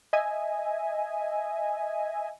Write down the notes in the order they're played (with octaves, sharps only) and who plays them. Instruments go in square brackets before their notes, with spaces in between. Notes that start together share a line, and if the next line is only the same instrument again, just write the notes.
[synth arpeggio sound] D#5 E5 G#5